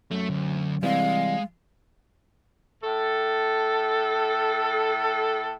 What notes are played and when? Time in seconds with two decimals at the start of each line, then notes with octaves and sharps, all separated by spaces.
0.11 F#2 A3
0.30 D2
0.83 C3 E3 G3 G#3 F5
2.83 A2 A4